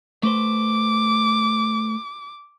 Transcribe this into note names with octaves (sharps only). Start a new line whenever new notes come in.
A3 B4 C5 D6